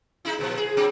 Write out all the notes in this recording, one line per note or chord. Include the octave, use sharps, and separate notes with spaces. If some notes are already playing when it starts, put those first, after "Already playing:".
G#3 D#4 E4
D#2 A#2 F3
G#4
F#3 C4 D4